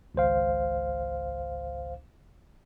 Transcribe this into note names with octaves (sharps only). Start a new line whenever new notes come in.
G#1 C#2 C5 F5